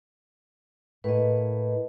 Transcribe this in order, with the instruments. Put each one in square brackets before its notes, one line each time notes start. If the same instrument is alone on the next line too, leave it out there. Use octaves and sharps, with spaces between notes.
[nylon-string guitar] A2 A#3 [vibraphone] B4 D#5